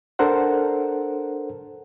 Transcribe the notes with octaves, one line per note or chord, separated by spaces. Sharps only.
D4 A4 A#4 C5 F#5